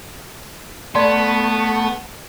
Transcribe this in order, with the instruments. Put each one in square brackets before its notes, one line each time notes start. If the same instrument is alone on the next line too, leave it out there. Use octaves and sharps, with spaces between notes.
[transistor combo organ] A3 [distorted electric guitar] B3 [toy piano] D5 C6